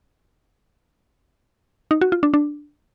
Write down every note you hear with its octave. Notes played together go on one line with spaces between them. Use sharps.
D#4
F#4
F4
D4
D4